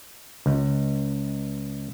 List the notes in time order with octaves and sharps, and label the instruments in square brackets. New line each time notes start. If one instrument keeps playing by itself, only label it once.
[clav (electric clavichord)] C#2